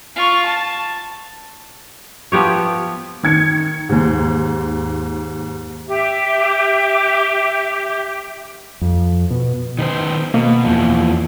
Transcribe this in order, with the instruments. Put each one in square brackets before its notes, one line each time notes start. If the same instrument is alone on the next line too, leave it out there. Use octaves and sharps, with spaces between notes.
[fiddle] F4 C#6
A5
[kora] F3 B3 G4 C#5
[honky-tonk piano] D#3 G#6 C#7
D#2 G#2
[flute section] G4 E5
[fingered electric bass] F2
B2
[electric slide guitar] D#3 B3 C5
[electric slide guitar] B2 [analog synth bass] A#3
[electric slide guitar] E2 F3